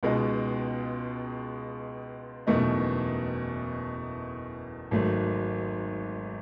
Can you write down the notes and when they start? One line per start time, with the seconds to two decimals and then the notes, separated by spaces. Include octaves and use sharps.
0.03 C#2 B2 G#3 D#4
2.47 F#1 E2 B2 A3 D#4
4.91 G#1 G#2 F#3 A3